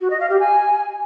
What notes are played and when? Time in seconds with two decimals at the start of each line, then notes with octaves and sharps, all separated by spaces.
0.01 F#4
0.10 D#5
0.20 F5
0.30 G4
0.40 G#5